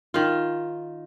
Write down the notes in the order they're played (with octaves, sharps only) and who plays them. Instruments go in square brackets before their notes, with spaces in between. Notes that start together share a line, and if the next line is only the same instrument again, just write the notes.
[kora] D#3 F4